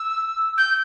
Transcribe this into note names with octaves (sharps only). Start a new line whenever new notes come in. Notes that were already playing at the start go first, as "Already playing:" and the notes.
Already playing: E6
G6